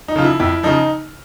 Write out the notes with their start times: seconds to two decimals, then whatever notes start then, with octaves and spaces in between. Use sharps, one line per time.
0.08 D#4
0.16 C#3 F3 F4
0.24 E4
0.39 F2 E4
0.63 C#3 F3 D#4